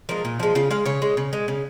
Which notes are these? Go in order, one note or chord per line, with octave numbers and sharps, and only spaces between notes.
F3 G#3 A#4
A#2
F3 G#3
C#3 F4
G#3 F5
C#3 C#5
G#3
C#3
G#3
C#3